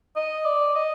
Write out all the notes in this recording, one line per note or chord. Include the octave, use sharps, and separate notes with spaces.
D#5
D5
D#5